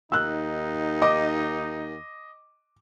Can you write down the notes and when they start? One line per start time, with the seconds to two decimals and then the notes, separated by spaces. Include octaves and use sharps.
0.12 D#2 D#4 E6 F#6
1.02 D#5 D6